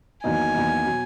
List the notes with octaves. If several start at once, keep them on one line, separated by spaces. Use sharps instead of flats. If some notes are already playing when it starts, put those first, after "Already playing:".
E2 D#3 F#3 A#3 D#4 G#5
E2 D#3 F#3 A#3 D#4
B2 F#3